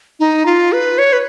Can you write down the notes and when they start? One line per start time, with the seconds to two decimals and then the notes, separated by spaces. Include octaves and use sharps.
0.20 D#4
0.46 F4
0.72 B4
0.98 C#5
1.13 B4